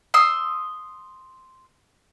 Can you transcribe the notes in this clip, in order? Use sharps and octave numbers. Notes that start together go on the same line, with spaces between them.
C6 D#6 E6